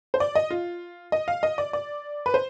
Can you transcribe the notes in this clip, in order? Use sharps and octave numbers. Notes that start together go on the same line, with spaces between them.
C5
D5
D#5
F4
D#5
F5
D#5
D5
D5
B4
C5